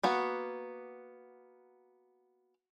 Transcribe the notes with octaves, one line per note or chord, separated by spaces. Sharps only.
A#3 B3 F#4